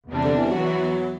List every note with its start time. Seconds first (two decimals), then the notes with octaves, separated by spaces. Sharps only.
0.09 E2 C3 G3 D4
0.24 D3
0.37 E3
0.51 E3 F#3 B3 F#4